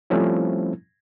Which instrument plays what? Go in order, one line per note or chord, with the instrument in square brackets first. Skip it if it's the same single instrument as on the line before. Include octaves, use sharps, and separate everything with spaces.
[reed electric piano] F3 G3 A3 C4 C#4 E4